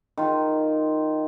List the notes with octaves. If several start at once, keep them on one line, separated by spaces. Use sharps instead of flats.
D#3 F4